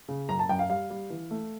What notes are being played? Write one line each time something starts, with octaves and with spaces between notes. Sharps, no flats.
C#3
F#2 A#5
A5
F#2 G5
F5
G3 F5
G3
E3
A3